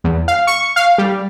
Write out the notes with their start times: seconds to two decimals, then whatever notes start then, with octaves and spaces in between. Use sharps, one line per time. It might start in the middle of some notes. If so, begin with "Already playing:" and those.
0.04 E2
0.28 F5
0.47 C#6
0.76 F5
0.98 G3